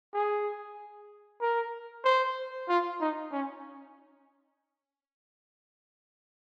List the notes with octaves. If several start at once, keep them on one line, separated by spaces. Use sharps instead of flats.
G#4
A#4
C5
F4
D#4
C#4